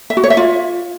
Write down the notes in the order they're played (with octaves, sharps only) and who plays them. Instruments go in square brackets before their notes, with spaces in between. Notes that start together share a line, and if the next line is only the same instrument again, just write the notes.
[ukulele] E5
F#4
C#5
E5
F4